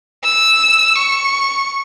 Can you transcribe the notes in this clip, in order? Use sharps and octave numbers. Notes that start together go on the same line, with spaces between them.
E6
C#6